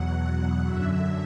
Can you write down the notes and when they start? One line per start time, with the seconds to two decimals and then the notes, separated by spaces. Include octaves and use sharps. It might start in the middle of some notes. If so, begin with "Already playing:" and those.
Already playing: E2 B2 F#3 F#5
0.65 F#2 D3 F#3 E5